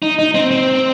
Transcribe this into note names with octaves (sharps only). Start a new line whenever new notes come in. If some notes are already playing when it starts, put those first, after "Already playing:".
D#4
D#4
C4
C4